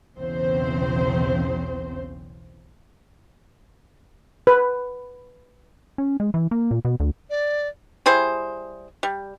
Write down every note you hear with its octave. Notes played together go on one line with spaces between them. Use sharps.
B1 E2 C#3 C4 C5
B4
C#4
G#3
E3
A#3
A#2
B2
D2
D5
G3 E4 G#4 C5
G3